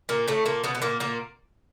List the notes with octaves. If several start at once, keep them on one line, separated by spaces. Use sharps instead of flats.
A#2 A#3
A2 A3
A#2 A#3
B2 B3
B3
A#2 A#3
A#2 A#3